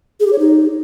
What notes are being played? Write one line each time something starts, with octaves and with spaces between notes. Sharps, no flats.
G#4
G4
C#5
D#4